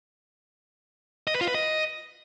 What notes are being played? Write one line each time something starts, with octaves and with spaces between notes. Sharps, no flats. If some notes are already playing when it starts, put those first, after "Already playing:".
D#5
B4
F4
B4
D#5